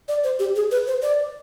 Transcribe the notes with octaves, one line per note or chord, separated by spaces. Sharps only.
D5
C5
G4
G#4
B4
C5
D5